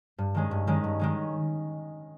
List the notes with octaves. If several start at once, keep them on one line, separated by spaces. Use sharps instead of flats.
G2
D#3 G#3 C#4
G2
D#3 G#3 C#4
G2
D#3 G#3 C#4